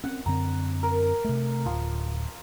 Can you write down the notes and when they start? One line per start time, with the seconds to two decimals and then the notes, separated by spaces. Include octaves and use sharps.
0.04 C4 C#4 F#5
0.26 F#2 D3 C4 A#5
0.83 A#4
1.25 C3 A3
1.66 D1 F3